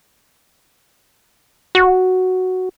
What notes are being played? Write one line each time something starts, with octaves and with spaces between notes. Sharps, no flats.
F#4